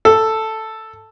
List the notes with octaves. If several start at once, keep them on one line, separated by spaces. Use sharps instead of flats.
A4